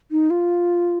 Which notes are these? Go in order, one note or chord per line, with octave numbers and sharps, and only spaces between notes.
D#4
F4